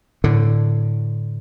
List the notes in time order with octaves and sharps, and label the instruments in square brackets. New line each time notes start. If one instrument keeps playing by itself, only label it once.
[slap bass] A2 D3